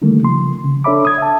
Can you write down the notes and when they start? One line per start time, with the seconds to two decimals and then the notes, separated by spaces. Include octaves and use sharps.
0.02 D3 D#3 G3 A3 A#3
0.23 C#3 F3 C6
0.64 C#3
0.84 D4 A4 C#5 E5 B5 D6
1.05 D#6 G#6
1.18 E5 A5